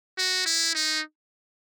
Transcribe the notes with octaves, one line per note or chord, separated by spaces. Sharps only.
F#4
E4
D#4